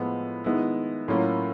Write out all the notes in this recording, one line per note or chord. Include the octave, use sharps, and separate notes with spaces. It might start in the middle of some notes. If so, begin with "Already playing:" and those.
Already playing: A2 F3 G#3 B3
D#3 G#3 B3 E4
A2 F#3 A#3 C#4 F4